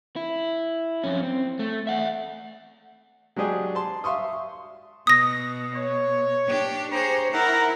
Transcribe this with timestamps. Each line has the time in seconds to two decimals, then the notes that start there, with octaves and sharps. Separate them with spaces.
0.16 E4
1.04 F2 C#4
1.23 C4
1.59 A3
1.87 E5 F#5
3.36 F#3 G#3 D4 G4 G#4
3.75 A5 C6
4.04 E5 F5 C6 C#6 D#6
5.07 B2 D#6 A#6
5.75 C#5
6.46 D4 G4
6.91 G4 G#4 C5 C#5 A#5
7.32 E4 A#4 F#5 A#5